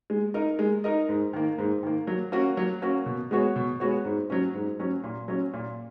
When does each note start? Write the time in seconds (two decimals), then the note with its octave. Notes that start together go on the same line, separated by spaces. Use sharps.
0.10 G#3
0.34 D#4 A#4 D#5
0.59 G#3
0.84 D#4 A#4 D#5
1.09 G#2
1.33 D#3 A#3
1.58 G#2
1.83 D#3 A#3
2.07 F#3
2.32 A#3 C#4 F#4
2.57 F#3
2.82 A#3 C#4 F#4
3.06 B2
3.31 G#3 B3 F#4 C#5
3.56 B2
3.80 G#3 B3 F#4 C#5
4.05 G#2
4.30 F#3 C#4
4.54 G#2
4.80 F#3 C#4
5.03 A#2
5.28 F#3 C#4
5.53 A#2